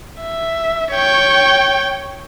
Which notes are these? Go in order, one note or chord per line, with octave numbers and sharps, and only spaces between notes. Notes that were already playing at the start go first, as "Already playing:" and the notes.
E5
C#5 G5